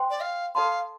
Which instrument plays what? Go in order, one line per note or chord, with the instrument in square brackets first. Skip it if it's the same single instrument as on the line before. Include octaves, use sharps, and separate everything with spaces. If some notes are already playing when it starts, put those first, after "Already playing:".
Already playing: [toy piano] C5 G5 C6
[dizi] D5
F5
[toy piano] A4 D5 A5 C6 [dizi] F5